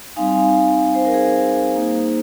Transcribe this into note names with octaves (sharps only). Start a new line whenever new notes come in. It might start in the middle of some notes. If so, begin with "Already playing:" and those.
G3 C4 D#4 F5 G#5
C5
A#4
G#4 C5
A#3 D#4